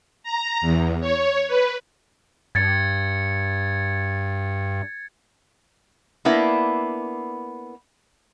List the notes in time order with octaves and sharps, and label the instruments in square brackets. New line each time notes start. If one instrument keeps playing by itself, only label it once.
[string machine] A#5
E2
C#5
B4
[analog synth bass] G2 [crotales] G#6 A6 C#7
[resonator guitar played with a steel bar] A#3 B3 D4 E4